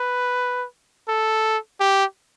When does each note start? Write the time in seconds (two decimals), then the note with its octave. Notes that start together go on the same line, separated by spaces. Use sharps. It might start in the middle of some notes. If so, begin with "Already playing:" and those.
Already playing: B4
1.08 A4
1.80 G4